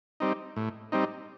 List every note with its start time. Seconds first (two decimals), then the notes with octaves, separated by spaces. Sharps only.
0.20 G3 C4 D#4
0.56 A2
0.92 G3 C4 D#4